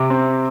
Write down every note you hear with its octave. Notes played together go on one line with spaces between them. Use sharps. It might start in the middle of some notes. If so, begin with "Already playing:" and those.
Already playing: C3 D6
C4